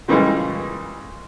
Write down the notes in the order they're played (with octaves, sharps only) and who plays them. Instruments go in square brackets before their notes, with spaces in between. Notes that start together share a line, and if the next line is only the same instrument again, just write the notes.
[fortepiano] A#2 C#3 E3 G3 G#3